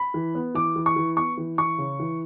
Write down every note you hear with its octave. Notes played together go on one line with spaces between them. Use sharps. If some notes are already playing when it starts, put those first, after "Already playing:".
Already playing: B5
E3
B3
E3 D6
E3
C#6
E3
B3 C#6
E3
E3 C#6
C#3
E3